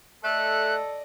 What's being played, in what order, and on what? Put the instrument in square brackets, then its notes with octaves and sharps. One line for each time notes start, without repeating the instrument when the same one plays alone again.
[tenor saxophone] A3 [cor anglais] A4 [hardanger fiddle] D5 D#5 [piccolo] F#6